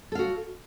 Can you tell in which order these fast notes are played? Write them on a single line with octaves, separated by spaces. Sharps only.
A4 F5 F#4